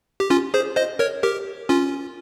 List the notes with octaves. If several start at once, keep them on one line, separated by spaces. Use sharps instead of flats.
G4
C#4 F4
G#4 C5
C5 D#5
A#4 C#5
G4 A#4
C#4 F4